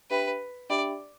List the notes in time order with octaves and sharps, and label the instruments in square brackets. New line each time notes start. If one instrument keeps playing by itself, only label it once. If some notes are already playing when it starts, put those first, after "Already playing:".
[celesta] D4 G4 E5 G5 B5 [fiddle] B4
[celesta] D4 G4 E5 G5 B5 [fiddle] D5